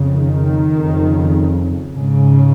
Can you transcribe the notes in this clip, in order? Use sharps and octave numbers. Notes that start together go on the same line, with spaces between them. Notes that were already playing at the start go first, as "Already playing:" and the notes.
Already playing: F2 C#3
D#3
F2 C#3
G#2 C#3